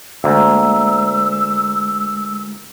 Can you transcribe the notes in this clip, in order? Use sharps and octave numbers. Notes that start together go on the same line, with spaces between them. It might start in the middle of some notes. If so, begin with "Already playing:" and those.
D2 G#3 A#3 E6